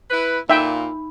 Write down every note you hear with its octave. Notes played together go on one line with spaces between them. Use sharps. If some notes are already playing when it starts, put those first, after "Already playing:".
E4 B4
A#2 A#3 D#4 F4 E5 G5 B5